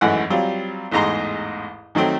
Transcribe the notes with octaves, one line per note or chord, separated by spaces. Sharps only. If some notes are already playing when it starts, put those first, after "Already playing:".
G#1 F#2 E3 A3 F#5
F#3 G3 C4 F4
A1 E2 G#2 D#5 A#5 C6
D#3 F#3 A3 C4